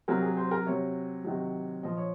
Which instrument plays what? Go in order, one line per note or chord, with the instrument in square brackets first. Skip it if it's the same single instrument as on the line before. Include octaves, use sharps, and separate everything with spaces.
[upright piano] C3 F#3 A#4
G#4
C5
A#4
C3 F#3 C#5
C3 D#3 F#3
A#2 F3 D#5
C#5